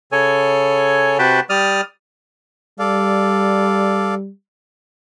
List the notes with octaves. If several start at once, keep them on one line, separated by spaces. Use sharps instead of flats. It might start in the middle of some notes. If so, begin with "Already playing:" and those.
C#3 A4 C#5 G#5
C3 F#4 B4 G5 A5
G3 D5 D#6 F6
G3 A4 D5 F5